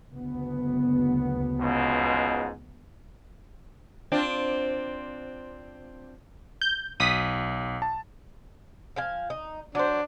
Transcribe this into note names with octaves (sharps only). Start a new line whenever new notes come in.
F#1 D2 B3
C#2 G#2 B2
C4 D4 F4
G6
B1 D#6 B6
A5
F3 F5 G#5
D#4
F#3 D4 C5